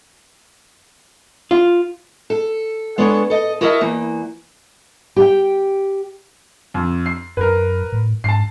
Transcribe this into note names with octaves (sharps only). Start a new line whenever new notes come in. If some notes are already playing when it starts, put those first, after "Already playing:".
F4
A4
G#3 B3 D4 A4 C#5
A4 D#5
E4 F#4 A#4 D#5 E5 A5
E2 E3 A#3
G4 G5
F2
C7
F#2 A#4 B4
A2
G#2 A5 C7